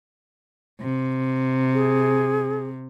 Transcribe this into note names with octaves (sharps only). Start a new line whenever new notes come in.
C3
G#4